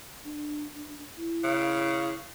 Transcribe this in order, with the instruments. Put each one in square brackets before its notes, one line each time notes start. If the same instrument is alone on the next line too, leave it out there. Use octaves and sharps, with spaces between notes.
[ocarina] D4
E4
[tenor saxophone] C#3